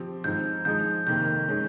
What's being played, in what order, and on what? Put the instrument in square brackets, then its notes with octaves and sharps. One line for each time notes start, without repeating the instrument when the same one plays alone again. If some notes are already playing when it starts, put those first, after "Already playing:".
Already playing: [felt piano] F3 C4 G4
[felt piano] G#2 F3 C4 [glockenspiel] G6
[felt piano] F3 G#3 D#4 [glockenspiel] G6
[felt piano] F2 C3 D#3 A#3 [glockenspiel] G6
[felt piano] D#3 G#3 C#4